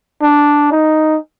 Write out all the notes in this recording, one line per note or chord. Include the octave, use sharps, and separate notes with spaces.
D4
D#4